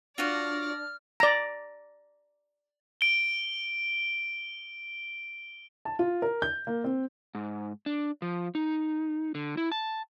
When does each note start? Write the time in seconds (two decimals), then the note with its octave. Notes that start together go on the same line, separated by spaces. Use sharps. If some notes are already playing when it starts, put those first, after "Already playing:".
0.18 D4 F4 F#4 C#5 D5 F6 A#6
1.20 D5 A#5
3.01 D7 G7
5.85 A5
5.99 F4
6.22 A#4
6.42 G6
6.67 A#3
6.84 C4
7.35 G#2
7.86 D4
8.22 F3
8.55 D#4
9.35 D3
9.57 E4
9.72 A5